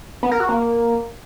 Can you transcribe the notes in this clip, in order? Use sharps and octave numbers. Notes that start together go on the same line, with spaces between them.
B3
A#4
F#4
A#3